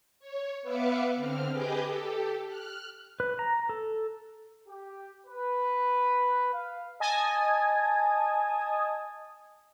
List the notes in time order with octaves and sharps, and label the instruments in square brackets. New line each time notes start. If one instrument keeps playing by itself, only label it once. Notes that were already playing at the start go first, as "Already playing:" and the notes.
[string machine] C#5
B3 B4 E5 F5 D6 C#7
D3 C4 F6
G4 G#4 B4 D#5 D6 G6
G4 A4
F6 F#6
[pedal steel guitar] B4
A#5
A4
[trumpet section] G4
B4
F5
[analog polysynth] D#5 G#5 A5 D#6